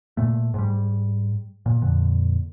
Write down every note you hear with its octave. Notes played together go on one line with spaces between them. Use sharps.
A#2 A3
G#2 G3
A#2
F2 A#2 D3